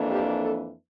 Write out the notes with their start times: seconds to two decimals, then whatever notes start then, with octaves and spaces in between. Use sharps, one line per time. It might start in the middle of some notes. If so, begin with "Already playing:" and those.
Already playing: F2 E3 A#3 D4
0.11 G4
0.41 A4